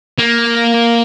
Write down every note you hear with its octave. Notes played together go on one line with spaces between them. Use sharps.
A#3